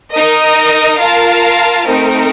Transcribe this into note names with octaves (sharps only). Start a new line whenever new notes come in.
D#4 A#4 D#5
F4 A#4 F5 A5
A3 C4 D#4 A#4